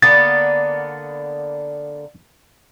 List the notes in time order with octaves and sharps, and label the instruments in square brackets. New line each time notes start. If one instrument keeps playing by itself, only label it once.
[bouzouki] D3 A#3 B3 [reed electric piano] A6